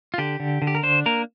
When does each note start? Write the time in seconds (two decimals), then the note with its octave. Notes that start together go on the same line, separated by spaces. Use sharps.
0.14 F4
0.18 D3 G4
0.40 D3
0.62 D3
0.67 G4
0.75 A#4
0.83 D4 C5
1.06 A#3 A#4